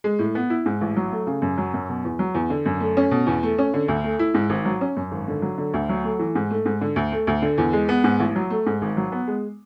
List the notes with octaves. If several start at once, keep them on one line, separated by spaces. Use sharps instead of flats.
G#3
A2
B3
E4
G#2
A1
F#3
A3
C#3
F#2
F#3
F#2
B2
E2
F#3
E2
D3
F#2
A3
C#4
B2
E2
A3
C#4
D3
D2
A3
E4
G#2
G#1
F#3
C#4
F#2
G#1
D3
F#3
D3
D2
F#3
A3
E3
G#2
A3
G#2
D3
D2
A3
D2
D3
E2
G#3
B3
G#2
A1
F#3
A3
G#2
G#1
F#3
B3
G#3